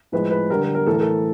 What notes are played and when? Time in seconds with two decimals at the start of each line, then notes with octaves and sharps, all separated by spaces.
0.12 A2 F3 G#3 B4
0.31 B4
0.50 D3 G3 A#4
0.62 A#4
0.75 A#4
0.87 A2 E3 A3 A4
0.94 A#4
1.01 A4